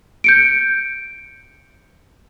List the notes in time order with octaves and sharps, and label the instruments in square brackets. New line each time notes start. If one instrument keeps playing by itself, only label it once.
[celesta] G6 C#7 D7